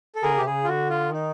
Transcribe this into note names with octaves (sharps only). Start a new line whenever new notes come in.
A4
D3 G#4 A#4
C#3
C3 G4
C#3 G#4
F4
D3 F#4
F4
D#3 D#4